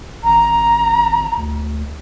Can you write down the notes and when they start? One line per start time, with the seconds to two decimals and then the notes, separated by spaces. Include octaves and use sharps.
0.24 G#1 A#5
1.37 D2